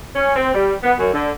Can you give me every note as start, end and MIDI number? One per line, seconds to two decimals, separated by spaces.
0.15 0.32 61
0.34 0.50 60
0.53 0.74 55
0.83 0.92 59
0.97 1.08 42
1.12 1.30 50